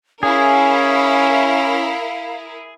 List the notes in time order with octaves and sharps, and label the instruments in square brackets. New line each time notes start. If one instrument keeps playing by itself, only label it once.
[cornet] C#4 [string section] E4 A#4 [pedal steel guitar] G#4 [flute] F5